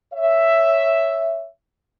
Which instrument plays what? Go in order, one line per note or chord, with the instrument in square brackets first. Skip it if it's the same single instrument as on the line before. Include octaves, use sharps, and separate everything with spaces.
[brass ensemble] C#5 E5